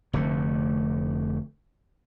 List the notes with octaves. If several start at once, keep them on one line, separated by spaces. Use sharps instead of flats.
F1 D3 A3